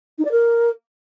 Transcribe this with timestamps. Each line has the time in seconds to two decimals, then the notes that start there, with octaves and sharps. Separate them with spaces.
0.18 D#4
0.25 D5
0.31 A#4